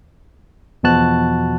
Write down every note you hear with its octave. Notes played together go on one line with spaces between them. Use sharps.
E2 B2 F3 F#4 A5 F#6